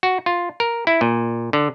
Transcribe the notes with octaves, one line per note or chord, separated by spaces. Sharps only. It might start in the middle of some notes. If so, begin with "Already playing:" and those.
F#4
F4
A#4
E4
A#2
D3